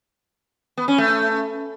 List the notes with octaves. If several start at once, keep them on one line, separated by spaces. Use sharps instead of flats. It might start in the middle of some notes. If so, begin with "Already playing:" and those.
B3
C#4
A3